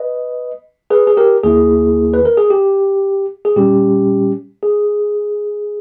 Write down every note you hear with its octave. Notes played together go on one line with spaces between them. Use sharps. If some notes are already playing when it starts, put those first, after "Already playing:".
Already playing: B4 D#5
G#4 B4
G#4
G4 A#4
D#2 D#3 A#3 E4 G#4
B4
A#4
G#4
G4
G#4
A#2 G3 C#4 G4
G#4